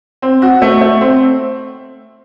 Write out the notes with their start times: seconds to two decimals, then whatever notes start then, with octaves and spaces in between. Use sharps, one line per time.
0.22 C4
0.42 F#4
0.62 A3
0.81 A3
1.01 C4